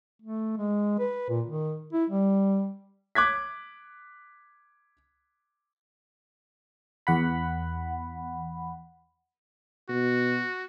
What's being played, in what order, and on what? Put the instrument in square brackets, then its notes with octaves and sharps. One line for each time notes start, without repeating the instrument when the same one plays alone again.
[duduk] A3
G#3
B4
A#2
D#3
E4
G3
[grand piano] D6 F#6 G#6 B6
[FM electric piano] E2 F#5 B5
[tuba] B2 [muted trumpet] F#4